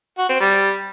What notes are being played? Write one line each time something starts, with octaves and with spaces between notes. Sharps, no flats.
F#4
C4
G3